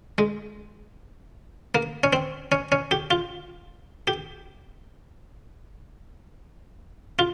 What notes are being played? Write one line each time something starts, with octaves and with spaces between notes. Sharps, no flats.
G#3
A#3
C#4
C4
C#4
C#4
G4
F4
G4
F4